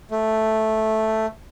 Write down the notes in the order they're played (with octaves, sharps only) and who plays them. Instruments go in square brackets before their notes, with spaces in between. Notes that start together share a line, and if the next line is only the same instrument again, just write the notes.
[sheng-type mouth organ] A3